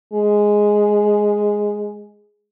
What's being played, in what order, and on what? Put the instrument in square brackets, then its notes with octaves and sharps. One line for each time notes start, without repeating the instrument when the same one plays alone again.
[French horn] G#3